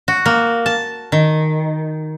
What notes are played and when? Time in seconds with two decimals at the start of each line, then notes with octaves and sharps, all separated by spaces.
0.08 F#4
0.26 A#3
0.66 A5
1.12 D#3